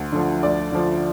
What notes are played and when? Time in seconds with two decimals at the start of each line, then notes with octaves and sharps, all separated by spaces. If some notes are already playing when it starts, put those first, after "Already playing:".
Already playing: D2
0.12 D3 F3
0.43 D2 D5
0.72 D3 F3